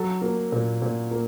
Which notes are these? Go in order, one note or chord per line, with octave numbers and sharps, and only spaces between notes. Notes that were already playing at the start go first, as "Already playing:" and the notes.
Already playing: F#3 A4
A#3
A#2
A#2
A#3